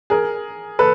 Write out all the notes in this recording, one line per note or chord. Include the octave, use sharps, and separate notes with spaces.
G#4 A#4
A4 B4